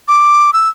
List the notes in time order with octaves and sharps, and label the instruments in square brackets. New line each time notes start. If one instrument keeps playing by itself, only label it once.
[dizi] D6
E6